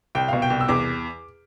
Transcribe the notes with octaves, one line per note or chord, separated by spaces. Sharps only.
C2 G5
B2 F5
G5
C2
E6
E2 D6